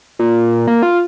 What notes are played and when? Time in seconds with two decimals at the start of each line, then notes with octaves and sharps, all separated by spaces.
0.19 A#2
0.67 A#3
0.83 F4